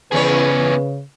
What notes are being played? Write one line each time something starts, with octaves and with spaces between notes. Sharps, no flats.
E2 C#3 B3 C#4 G#4 B4 C#5